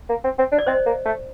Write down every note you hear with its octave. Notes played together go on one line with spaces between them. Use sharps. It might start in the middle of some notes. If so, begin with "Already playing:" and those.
A#3
C4
C4
D4
D5
C4 C5 D#5
A#3
A3